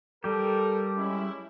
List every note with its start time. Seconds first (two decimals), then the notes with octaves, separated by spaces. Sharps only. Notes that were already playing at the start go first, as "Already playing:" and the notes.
0.24 G3 G4 A4 A#4
0.97 G#3 C#4 E4